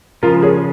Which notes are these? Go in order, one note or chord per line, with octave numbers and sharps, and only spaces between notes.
C#3 F3 G#3 F4 A#4
G#4 C#5